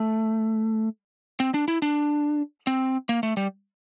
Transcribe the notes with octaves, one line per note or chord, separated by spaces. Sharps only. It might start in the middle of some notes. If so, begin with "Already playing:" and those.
Already playing: A3
C4
D4
E4
D4
C4
A#3
A3
G3